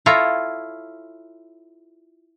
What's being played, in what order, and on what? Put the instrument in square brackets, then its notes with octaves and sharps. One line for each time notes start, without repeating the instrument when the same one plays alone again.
[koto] E4 F4 A4 C#5 A#5